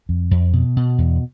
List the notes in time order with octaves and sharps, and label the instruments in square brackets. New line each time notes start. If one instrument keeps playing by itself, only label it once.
[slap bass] F2
F2
B2
B2
E2